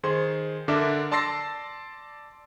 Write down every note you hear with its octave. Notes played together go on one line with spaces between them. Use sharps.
D#3 G#4 C5 C6
D3 D4 A#4 E5 D6
D5 A5 C6 E6 A#6 C7